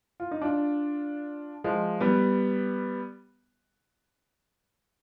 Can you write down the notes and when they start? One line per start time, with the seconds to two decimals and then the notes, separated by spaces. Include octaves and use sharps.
0.20 F4
0.31 D#4
0.42 D4 F4
1.64 F3 G#3
2.00 G3 B3